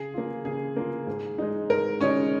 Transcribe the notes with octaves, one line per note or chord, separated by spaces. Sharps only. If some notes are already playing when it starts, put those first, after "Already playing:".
Already playing: C#3 G#4
A#3 F4
C#3 G#4
A#3 F4
G#2
G#3 D#4
G#2 A#4
G#3 C#4 D#4 C#5